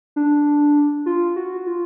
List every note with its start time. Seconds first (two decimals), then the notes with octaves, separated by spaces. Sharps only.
0.16 D4
1.06 F4
1.36 F#4
1.66 F4